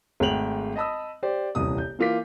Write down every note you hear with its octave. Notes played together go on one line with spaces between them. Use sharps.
G#1 G#3 A3 G5 F7 F#7
D#5 A5 B5 D#6 E6
G4 C5 D5
D#1 C2 E3 D#6
G6
E3 A#3 F4 D6 B6